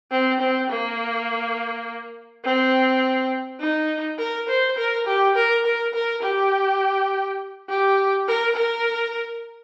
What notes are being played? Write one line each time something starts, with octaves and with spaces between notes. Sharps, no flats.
C4
C4
A#3
C4
D#4
A#4
C5
A#4
G4
A#4
A#4
A#4
G4
G4
A#4
A#4